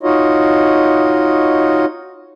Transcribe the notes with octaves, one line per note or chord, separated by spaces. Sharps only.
D#4 F4 F#4 C#5 D#5